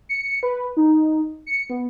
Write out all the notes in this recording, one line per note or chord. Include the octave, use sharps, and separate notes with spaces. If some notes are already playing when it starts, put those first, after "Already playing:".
C#7
B4
D#4
C#7
B3